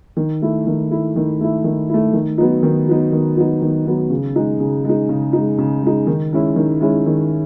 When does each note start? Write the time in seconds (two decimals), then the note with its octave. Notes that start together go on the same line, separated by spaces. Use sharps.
0.17 D#3
0.42 A3 E4
0.67 D#3
0.91 A3 E4
1.16 D#3
1.41 A3 E4
1.64 D#3
1.89 A3 E4
2.13 D#3
2.38 F#3 B3 D#4
2.63 D#3
2.88 F#3 B3 D#4
3.12 D#3
3.36 F#3 B3 D#4
3.62 D#3
3.86 F#3 B3 D#4
4.10 C#3
4.36 G#3 D#4
4.60 C#3
4.85 G#3 D#4
5.09 C#3
5.33 G#3 D#4
5.58 C#3
5.83 G#3 D#4
6.07 D#3
6.33 G#3 C#4 E4
6.56 D#3
6.81 G#3 C#4 E4
7.06 D#3